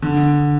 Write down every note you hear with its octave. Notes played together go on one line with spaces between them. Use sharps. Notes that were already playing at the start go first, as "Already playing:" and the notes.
D3